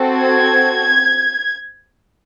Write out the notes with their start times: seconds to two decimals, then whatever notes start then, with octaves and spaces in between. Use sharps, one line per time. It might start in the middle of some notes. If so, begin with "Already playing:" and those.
Already playing: C4 F#4 A4
0.15 G#6